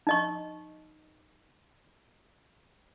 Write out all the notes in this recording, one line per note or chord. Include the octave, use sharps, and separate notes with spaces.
D#4 D#5 C#6